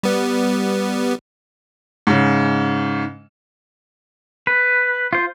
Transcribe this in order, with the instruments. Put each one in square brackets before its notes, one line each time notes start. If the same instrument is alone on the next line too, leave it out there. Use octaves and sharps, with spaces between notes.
[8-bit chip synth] G3 B3
[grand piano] G#2 C#3
[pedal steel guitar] B4
F4 C5